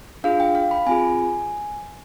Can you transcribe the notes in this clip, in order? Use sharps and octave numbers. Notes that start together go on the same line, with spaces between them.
D4 F4 G#4 F5
G5
F5
B5
C4 F4 G#4 G#5